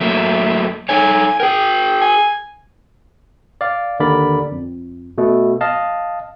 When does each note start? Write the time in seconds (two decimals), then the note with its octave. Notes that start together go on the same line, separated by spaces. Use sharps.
0.01 F#3 A3 A#3 E5
0.89 D#4 A4 C#5 G#5
1.40 G#4 A#4 G5
2.01 G#5
3.61 D5 F5
4.00 D#2 D3 A#4 D5 B5
4.52 F2
5.18 B2 A3
5.61 D#5 F5 A5